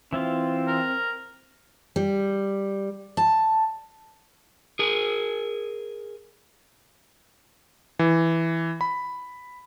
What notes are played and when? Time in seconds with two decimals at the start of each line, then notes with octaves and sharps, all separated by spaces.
0.13 E3 C4 E4 F4
0.67 A#4
1.96 G3
3.17 A5
4.79 G#4 A#4
7.99 E3
8.81 B5